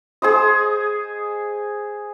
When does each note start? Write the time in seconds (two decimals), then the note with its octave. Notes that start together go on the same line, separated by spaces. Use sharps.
0.22 G#4 C5 D#5